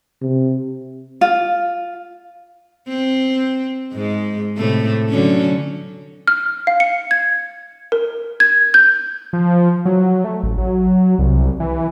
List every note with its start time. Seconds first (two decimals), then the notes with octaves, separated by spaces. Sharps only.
0.22 C3
1.21 F4
2.88 C4
3.93 G#2 G#3
4.57 A2 C3 A3
5.10 D3 F#3 C#4
6.27 F6
6.67 F5
6.80 C#7
7.11 G#6
7.92 A#4
8.40 G#6
8.74 G6
9.33 F3
9.85 F#3
10.24 A3
10.43 A1
10.58 F#3
11.19 C2
11.60 E3